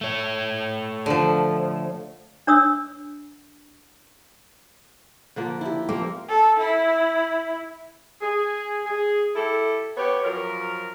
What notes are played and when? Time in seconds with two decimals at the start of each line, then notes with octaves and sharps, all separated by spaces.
0.01 A3 C#5
1.06 D3 F3
2.47 D4 C#5 D#6 E6
5.36 D3 F3 A#3
5.61 E4 G4
5.89 F3 A#3 C4
6.28 A4
6.59 E4
8.21 G#4
8.86 G#4
9.36 E4 G4 A4
9.97 B3 G4 C#5
10.24 F#2 F3 A#4